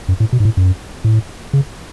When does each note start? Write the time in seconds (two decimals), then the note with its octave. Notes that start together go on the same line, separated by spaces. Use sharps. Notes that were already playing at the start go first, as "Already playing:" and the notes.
0.09 F#2
0.20 A2
0.33 B2
0.40 G#2
0.45 A2
0.57 F#2
1.04 A2
1.53 C#3